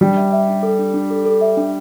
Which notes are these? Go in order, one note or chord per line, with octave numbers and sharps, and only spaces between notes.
G3 D4
E5
E5
D4
A4
D4
D4
A4
A4
E5
D4